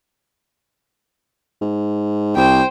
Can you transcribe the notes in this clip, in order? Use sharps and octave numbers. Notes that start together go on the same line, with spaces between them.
G#2
C2 C5 G5